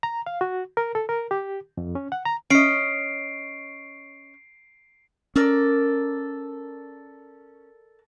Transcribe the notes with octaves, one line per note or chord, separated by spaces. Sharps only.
A#5
F5
F#4
A#4
A4
A#4
G4
F2
C#4
F#5
A#5
C#4 D#5 C7 D7
C#4 A4 A#4 D5